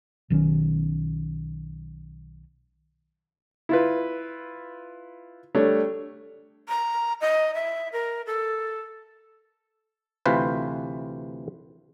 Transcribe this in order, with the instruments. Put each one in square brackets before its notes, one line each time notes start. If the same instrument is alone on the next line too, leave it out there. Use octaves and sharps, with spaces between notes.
[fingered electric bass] B1 D#3 E3 C#4
[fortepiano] E4 F4 B4
G3 A3 D4 C#5
[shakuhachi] A#5
D#5
E5
A#4
A4
[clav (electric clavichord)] D2 C3 E3 F4 B4 C5